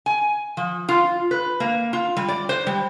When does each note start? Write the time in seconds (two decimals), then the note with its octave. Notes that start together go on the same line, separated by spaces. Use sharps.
0.06 G#5
0.57 F3
0.89 F4
1.31 B4
1.60 A#3
1.93 F4
2.17 G3
2.28 D5
2.49 C5
2.67 G3